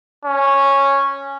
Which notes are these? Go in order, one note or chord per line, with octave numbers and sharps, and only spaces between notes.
C#4